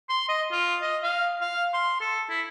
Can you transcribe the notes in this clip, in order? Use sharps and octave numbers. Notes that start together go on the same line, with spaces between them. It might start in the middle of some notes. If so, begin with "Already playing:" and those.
C6
D#5
F4
D#5
F5
F5
C6
A4
E4